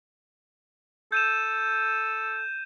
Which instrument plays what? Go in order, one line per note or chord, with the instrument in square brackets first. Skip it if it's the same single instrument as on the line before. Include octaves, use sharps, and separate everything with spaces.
[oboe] A4 [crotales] G6 D#7 E7